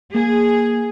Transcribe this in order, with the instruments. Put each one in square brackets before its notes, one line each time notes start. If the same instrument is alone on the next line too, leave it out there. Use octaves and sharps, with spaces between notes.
[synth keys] A#3 [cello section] G#4